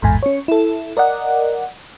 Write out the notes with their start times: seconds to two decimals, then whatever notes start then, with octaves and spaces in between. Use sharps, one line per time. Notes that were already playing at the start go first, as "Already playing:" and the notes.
0.02 A1 E2 G#2 G#5
0.23 C#4 C#5
0.48 E4 A4
0.97 A#4 D5 D#5 F#5